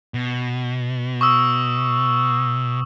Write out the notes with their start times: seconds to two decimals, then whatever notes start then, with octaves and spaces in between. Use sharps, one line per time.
0.14 B2
1.21 C#6 D#6 E6